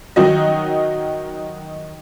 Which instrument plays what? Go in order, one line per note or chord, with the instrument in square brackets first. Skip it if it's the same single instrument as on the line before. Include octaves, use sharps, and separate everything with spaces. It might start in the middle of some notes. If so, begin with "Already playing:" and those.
[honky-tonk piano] D#3 F#3 D#4 F#4 D#5